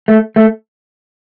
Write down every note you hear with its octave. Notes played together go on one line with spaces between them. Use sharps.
A3
A3